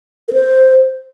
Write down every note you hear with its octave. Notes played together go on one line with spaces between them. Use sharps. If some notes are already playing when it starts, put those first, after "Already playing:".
A#4
C5